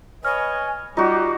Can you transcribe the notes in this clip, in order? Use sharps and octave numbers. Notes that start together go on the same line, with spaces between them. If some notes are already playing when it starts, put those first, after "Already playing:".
B4 C#5 D#5 G#5 F6
G3 D#4 F4 F#4 D6